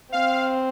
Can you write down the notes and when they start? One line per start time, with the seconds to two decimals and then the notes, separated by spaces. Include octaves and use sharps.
0.12 C4 F5